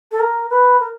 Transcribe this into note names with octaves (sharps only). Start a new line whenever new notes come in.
A4
A#4
B4
A#4